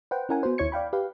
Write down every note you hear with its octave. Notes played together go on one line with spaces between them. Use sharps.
B4 C5 F#5 G5
C#4 E4 A#4 F#5 G#5
B3 F#4 C5
D#2 E4 C#5 G#6 C#7
D5 F5 G5 B5
G4 B4 F5